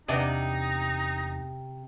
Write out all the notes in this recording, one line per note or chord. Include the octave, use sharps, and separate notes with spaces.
E2 C3 B3 D4 D#4 D#5